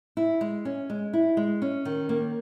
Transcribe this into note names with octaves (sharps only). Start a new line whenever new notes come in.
E4
G#3
C#4
G#3
E4
G#3
C#4
D#3
A#3